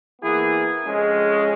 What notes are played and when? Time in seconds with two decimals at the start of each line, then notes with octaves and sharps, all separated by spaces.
0.22 E3 A#3 B3 E4 G#4
0.86 F2 G#3 C#4